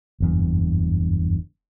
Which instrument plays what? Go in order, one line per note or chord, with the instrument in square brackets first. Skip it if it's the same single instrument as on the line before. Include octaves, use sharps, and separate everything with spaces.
[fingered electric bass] F#1 E2 G2